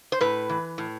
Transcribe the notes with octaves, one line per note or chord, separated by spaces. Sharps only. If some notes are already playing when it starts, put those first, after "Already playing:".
C5
A2 B4
E3
A2